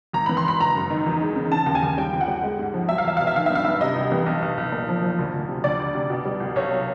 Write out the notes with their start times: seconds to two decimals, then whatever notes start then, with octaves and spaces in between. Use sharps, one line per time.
0.13 G#1 A#5
0.26 E3 B5
0.37 C6
0.44 G#1 B5
0.60 F#1 A#5
0.75 F#2
0.90 D#3
1.06 E2
1.21 G#3
1.36 C#3
1.52 C#3 A5
1.66 D#2
1.75 G#5
1.83 D#2
1.98 G3 G5
2.13 G1
2.21 F#5
2.28 G3
2.43 G#3
2.59 G#2
2.74 F3
2.89 F#3 E5
2.98 F5
3.04 E2 E5
3.17 B2 F5
3.27 E5
3.36 D#3 F5
3.46 G2 E5
3.55 F5
3.65 G2 E5
3.81 C3 D#5
3.96 C2
4.12 E3
4.26 B1
4.42 B1
4.58 B1
4.72 A#2
4.89 F3
5.03 F3
5.19 D2
5.34 D2
5.49 C3
5.64 D2 D5
5.79 D2
5.95 C3
6.10 B2
6.26 G3
6.40 C2
6.56 B1 C#5
6.71 F#3